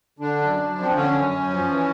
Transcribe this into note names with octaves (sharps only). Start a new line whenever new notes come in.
D3 D4
F#2
F#2
F3
C4
D3 C#4
F#2
F#2
F3
E3